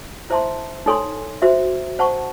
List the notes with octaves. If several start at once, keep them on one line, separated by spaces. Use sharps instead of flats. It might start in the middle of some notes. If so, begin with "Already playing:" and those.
E4 C5 E5 A5 C6
D#4 A4 C#5 G#5 C6
F#4 C5 E5
C5 F#5 A5 C#6